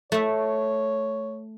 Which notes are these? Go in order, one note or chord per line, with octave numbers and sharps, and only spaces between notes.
A3 C#5 E5